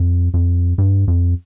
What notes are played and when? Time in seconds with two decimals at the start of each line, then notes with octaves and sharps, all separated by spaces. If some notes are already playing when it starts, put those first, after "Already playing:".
Already playing: F2
0.34 F2
0.78 G2
1.08 F2